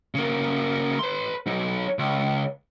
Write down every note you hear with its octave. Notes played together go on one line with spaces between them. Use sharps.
C#3 A#3
B4 C6
F#3 D#4
C#2